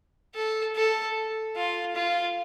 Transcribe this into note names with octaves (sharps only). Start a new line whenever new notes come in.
A4
A4
F4
F4